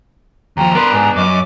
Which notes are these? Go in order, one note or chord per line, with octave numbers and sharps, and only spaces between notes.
D#2 F3 G5 A#5
B3 D4 A#4 B4 C6
G#2 G#5
F#2 D#5 D6